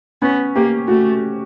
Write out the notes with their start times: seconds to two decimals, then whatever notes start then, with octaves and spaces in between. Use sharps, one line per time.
0.22 B3 C#4
0.55 A#3 G4
0.88 A3 F#4